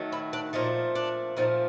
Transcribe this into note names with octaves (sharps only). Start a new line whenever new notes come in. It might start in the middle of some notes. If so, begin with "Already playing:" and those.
Already playing: D#3 F#3 A3
E4
D4
A#2 F3 A3 D#4
D4
A#2 F3 A3 D#4